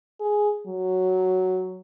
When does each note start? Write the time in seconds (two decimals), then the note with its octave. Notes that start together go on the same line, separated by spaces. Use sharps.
0.20 G#4
0.67 F#3